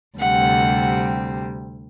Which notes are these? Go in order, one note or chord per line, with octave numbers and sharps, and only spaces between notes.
D2 C3 G3 C4 F#5